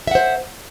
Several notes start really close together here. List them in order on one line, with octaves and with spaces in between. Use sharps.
E5 F#5 C5